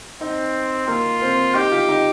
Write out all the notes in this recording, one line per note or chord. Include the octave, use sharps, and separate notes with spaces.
C4 D#4
A#3 F4
C4
D#4 G4
F4
D#4